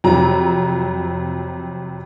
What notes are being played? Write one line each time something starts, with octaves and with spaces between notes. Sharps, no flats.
F2 C3 F#3 A#5